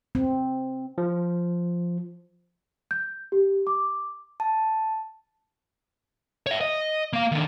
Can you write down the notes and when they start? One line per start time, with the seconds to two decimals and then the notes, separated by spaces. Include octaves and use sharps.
0.15 C4
0.98 F3
2.91 G6
3.32 G4
3.67 D6
4.40 A5
6.47 C#5 E5
6.61 D#5
7.13 A#3 F5
7.32 D#3 D4